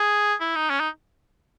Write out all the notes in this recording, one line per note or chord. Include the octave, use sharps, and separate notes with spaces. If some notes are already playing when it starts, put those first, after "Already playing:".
Already playing: G#4
E4
D#4
C#4
D#4